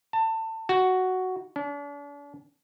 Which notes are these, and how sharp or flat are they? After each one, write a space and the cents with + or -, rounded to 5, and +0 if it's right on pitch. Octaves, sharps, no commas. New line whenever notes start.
A5 +25
F#4 +5
D4 -40